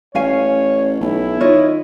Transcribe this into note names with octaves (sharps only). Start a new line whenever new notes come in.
A1 C#4 C#5 F5 G#5
B1 E4
D#3 F4 C#5 D#5